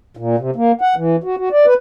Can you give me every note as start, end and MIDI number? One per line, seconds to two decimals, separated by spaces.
0.17 0.36 46
0.39 0.51 48
0.56 0.72 58
0.81 0.95 78
0.96 1.16 52
1.24 1.36 66
1.38 1.49 66
1.52 1.66 74
1.66 1.74 71